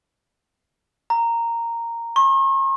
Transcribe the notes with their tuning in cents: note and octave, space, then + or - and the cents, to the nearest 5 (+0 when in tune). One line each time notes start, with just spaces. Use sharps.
A#5 -10
C#6 -45